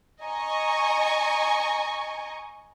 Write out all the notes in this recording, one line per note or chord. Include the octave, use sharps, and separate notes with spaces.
D#5 G#5 A#5 C#6